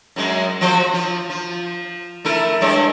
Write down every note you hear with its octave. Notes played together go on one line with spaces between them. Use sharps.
F#2 F#3 G#3
F3 F#4 C5
F3
F3
A3 E4 A#4
G2 G#3 C#5